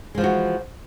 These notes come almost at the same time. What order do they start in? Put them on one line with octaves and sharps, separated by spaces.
G#3 F3 E3 F#4